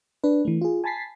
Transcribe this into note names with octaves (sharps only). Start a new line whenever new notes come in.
D4 B4
E3 A3
F4 G#4
G#5 A5 B5 A6 B6 C7